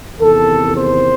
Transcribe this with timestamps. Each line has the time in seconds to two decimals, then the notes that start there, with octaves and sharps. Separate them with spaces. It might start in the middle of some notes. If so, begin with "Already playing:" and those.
0.20 E2 C3 D#3 A4
0.75 C5